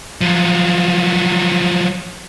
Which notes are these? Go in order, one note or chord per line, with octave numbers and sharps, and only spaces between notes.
F3 F#3